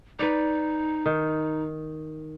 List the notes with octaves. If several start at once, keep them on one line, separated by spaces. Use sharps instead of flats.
D#4 B4 D5
D#3